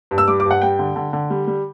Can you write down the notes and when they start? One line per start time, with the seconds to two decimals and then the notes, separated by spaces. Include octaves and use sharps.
0.11 G2
0.18 E6
0.28 G3 D6
0.40 D6
0.45 G2
0.51 F#5
0.62 G3 G5
0.79 D3
0.96 D3
1.13 D3
1.30 G3
1.47 G3